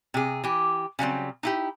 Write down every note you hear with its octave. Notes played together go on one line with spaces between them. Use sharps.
C3 G#4
E3 G4
C#3 F#3 G3 C4
D#4 E4 G4